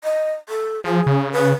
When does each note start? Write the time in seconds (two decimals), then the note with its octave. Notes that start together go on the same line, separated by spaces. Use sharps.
0.04 D#5
0.49 A4
0.84 F3 G#4
1.06 C#3
1.32 B4